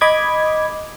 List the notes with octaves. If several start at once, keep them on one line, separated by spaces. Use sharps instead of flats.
D#5 B5 D6 D#6 G#6